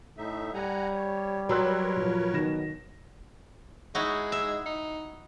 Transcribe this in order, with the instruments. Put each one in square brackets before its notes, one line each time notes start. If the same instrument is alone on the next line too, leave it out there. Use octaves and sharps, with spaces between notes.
[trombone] A2 [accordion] D#4 E5
[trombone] G3 [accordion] F#5 G#5 A#5
[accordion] C#5
[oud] F#3 [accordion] A#4 B4 C#5 [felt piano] C6 E6 F#6
[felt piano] A#2 F3
[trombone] B2 [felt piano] D#3 A#6 E7
[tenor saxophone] G#3 [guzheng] D#4 E4 F#4
[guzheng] E5
[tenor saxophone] D#4